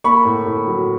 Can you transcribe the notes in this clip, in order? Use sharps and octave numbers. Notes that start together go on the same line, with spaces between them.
A#3 B5 C#6
A2
A2
F#3